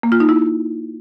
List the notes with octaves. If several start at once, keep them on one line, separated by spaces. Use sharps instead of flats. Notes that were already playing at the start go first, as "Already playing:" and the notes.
A#3
F4
D#4
E4